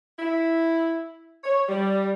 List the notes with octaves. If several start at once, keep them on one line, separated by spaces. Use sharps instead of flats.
E4
C#5
G3